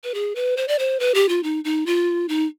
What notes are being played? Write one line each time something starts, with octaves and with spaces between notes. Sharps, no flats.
B4
G#4
B4
C5
D5
C5
B4
G4
F4
D#4
D#4
F4
D#4